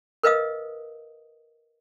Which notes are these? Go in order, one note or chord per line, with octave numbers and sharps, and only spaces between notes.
A#4 B4 D#5 F5 D#6